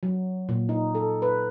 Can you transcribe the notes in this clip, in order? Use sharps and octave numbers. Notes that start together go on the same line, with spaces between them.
F#3
A#2
D#4
A4
B4